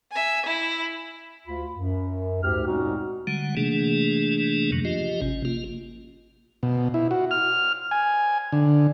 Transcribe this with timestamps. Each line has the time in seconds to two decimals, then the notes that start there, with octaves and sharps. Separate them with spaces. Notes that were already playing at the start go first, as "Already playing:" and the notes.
0.12 E5 G#5
0.46 E4
1.46 D2 F4 B5
1.75 F#2
2.42 D2 G#2 G4 F6
2.66 A#2 G#3 C4 C#4 D#4 F#4
3.27 D3 G3 G#3 F#5
3.57 C3 E3 A3 A#3 D4 G#4
4.72 F#2 D#3 F#3
4.85 F3 F4 G4 D#5
5.22 G#1 C3 C#4
5.45 A#3 F4
6.63 B2
6.94 E4
7.11 F#4
7.31 F6
7.91 G#5
8.52 D3